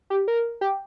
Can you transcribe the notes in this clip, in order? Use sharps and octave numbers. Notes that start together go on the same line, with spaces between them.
G4
A#4
G4